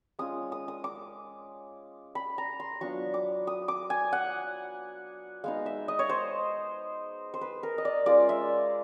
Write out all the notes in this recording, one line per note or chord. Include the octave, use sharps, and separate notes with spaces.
G#3 C#4 F4 D#6
D#6
D#6
D6
B5
A#5
C6
F#3 B3 D4 F4 C#6
D6
D#6
D6
G#5
F#5
G#3 B3 D#4 F5
E5
D#5
C#5
C5
C5
B4
A#4
D#5
D5
G#3 C#4 F4 D5
E5